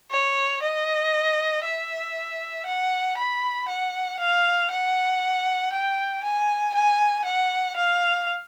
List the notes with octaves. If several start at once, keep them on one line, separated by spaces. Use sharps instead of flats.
C#5
D#5
E5
F#5
B5
F#5
F5
F#5
G5
G#5
G#5
F#5
F5